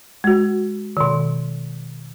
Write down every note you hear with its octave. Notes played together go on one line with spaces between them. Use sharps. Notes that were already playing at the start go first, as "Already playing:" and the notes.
G#3 F#4
B2 D#3